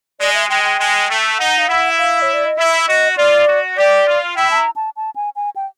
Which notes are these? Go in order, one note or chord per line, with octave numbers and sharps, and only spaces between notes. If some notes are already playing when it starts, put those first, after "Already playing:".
G#3 D5
E5
G#3 G5
G5
G#3
A3
D#4 F#5
F5
E4 F#5
F5
C#5
D5
D#5
E4 E5
F#4 D#5
F4 D5
F#4
G4 D5
F4
E4 G5
A5
A#5
A5
A5
G#5
G#5
G5